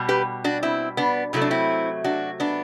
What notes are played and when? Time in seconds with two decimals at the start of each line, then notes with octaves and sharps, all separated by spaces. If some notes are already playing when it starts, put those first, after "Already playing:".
Already playing: B2 G3
0.09 G4 B4
0.44 D4 F#4
0.63 C4 E4
0.97 B3 D4
1.33 C3 F#3 A3 E4
1.42 D4
1.51 C4 E4
2.04 D4 F#4
2.40 B3 D4